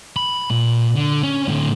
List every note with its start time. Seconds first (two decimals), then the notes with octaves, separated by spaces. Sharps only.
0.16 B5
0.50 A#2
0.96 D3
1.23 C#4
1.48 A2 D3